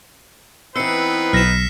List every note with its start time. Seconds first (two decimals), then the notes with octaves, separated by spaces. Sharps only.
0.76 E3 B3 C4 D#4 B4 E6 C7 C#7
1.33 B1 F6 A#6 B6 E7